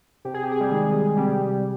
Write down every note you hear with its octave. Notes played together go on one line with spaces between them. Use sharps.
C3 G4
G#4
G4
G#4
G3 G4
D#3 G3 G#3 G#4
C3 G3 G4